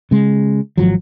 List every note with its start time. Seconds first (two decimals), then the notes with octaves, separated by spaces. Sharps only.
0.11 C#3 G#3
0.77 G#1 F3 F#3